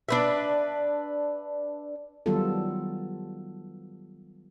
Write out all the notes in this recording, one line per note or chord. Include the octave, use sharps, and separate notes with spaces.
D4 B4 E5
D#3 F#3 G3 B3 F4 A4